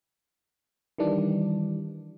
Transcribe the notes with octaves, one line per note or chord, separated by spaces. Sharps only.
D#3 E3 G3 D4